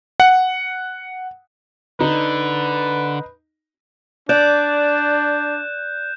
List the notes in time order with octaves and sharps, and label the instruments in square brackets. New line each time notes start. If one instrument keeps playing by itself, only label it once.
[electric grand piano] F#5
[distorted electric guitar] D3 [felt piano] D#4 [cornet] B4
[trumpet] D4 [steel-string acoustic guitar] D5 [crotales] F#6 G6 E7